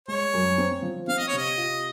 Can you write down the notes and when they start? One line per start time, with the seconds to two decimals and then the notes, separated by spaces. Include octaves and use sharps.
0.08 G#3 C#5
0.34 F#2
0.58 C4
0.83 F3
1.08 C4 F5
1.18 D#5
1.27 C#5
1.33 C3 D#5
1.57 F4